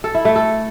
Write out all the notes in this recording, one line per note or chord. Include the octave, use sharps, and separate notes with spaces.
A4
E4
A3
A4